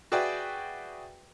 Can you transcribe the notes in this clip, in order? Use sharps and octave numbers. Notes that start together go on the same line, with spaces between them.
F#4 G#4 B4 D5 E5 G5